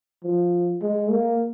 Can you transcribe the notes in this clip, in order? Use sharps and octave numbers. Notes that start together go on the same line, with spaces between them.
F3
G#3
A#3